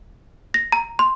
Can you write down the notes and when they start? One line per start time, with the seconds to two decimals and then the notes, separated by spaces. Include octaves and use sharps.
0.54 A#6
0.72 A#5
0.99 C6